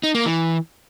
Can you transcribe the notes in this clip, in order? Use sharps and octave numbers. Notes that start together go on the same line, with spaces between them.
D#4
A#3
E3